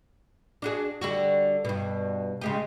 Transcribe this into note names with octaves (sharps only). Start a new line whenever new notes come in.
D4 F#4 G#4
D3 G3 F#4
G2 B2
C#3 G#3 G4